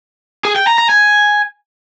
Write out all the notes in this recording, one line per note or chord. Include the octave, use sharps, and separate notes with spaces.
G#4
G5
A#5
A#5
G#5